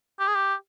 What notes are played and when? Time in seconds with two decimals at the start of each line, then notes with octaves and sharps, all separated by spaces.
0.20 G4
0.28 G#4
0.35 G4